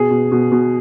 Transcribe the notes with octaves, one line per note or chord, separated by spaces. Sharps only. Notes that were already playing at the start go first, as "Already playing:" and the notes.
Already playing: B2 G#4
B2
B2
B2